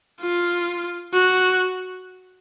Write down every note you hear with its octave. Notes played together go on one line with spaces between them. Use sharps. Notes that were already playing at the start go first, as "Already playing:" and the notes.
F4
F#4